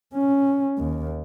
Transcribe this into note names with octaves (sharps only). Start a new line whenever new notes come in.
C#4
D#2